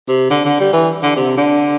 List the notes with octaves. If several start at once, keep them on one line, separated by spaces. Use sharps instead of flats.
C3
D3
D3
G3
E3
D3
C3
D3